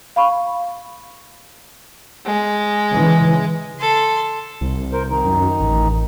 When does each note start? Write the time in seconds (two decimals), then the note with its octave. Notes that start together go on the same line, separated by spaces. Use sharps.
0.16 F5 B5 C#6
2.26 G#3
2.92 C#3 E3
3.79 A4 C6
4.61 C2
4.92 A#4 C5
5.10 D#3 D#4
5.25 F#2
5.60 A1